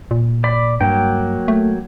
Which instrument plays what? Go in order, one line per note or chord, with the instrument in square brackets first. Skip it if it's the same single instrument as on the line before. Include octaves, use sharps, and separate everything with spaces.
[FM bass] A#2
[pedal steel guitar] D5 B5
[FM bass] G2 [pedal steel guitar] F#3 A#3 G5
[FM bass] A3